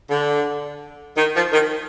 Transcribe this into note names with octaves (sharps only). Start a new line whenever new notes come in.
D3
D#3
F3
D#3